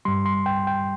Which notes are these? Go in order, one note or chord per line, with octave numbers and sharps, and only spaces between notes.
G2 G3 C6
C6
G5
G5